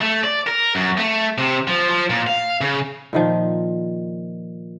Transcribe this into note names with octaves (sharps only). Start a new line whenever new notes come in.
A3
D5
A#4
F#2
A3
C3
F3
F3
A#2
F5
C#3
A#2 D#3 F3